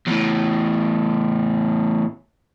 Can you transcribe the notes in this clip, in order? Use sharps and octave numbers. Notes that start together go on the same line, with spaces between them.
E2 A2